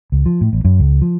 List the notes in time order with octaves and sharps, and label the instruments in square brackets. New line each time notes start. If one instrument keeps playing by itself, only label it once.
[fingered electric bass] C#2
F3
A2
A1
F#2
C#2
F3